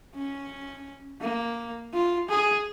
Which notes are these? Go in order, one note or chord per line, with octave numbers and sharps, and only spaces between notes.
C#4
A#3
F4
G#4